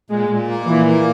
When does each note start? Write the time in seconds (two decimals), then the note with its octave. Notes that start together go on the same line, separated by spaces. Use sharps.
0.10 A#2 G#3
0.29 A#2
0.48 A#3
0.66 A#2 E3
0.86 A#3